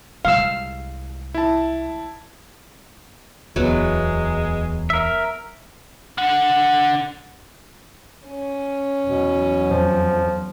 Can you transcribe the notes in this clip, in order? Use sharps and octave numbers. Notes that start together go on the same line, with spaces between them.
C2 G#3 F5 E6
E4 A5
D1 E2 F#3 G#3 B3
A#4 E5
D4 F#5
C#4
E2 B2 F#3
F2 F3